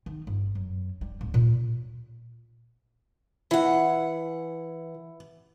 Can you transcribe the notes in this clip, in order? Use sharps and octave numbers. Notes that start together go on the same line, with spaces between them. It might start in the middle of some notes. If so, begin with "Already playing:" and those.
D#3
G1
F#2
G3
D1
A#2
E3 E4 F#5